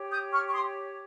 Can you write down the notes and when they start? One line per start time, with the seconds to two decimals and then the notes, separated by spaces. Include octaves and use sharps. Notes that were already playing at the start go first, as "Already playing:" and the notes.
Already playing: G4 C#5
0.10 D#6 G6
0.32 C#6 F6
0.47 C#6
0.52 C6 D#6